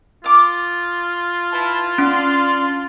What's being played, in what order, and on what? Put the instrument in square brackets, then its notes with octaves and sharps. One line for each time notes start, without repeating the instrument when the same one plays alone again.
[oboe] F4 [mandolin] D6 F6
[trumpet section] E4 B4 A5
[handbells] C#4 [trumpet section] D4 F5 C6